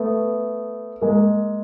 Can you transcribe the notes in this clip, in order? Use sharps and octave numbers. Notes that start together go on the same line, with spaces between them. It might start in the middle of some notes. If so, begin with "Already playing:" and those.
Already playing: A3 B3
G#3 A#3